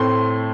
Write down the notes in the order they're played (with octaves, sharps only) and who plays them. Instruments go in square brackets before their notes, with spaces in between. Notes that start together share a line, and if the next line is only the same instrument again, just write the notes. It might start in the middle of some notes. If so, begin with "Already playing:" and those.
Already playing: [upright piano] A2 A3 C4 C6